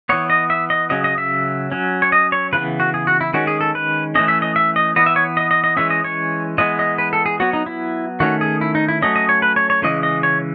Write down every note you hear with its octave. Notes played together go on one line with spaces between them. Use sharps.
E3 B3 C#5
D#5
E5
D#5
C#3 F#3 C#4 D#5
D#5
E5
F#3 C#4
C#5
D#5
C#5
C#3 E3 B3 B4
F#4
G#4
F#4
E4
D#3 G#3 C#4 F#4
G#4
A4
B4
E3 A3 C#4 D#5
E5
D#5
E5
D#5
E3 B3 D#5
E5
C#5
D#5
D#5
D#5
E3 G#3 C#4 E5
D#5
C#5
E3 G#3 B3 D#5
D#5
B4
A4
G#4
F#3 B3 F#4
D#4
E4
D#3 A3 C#4 F#4
G#4
E4
D#4
E4
F#3 A3 C#4 D#5
D#5
C#5
B4
C#5
C#5
C#3 E3 G#3 C#4 D#5
D#5
C#5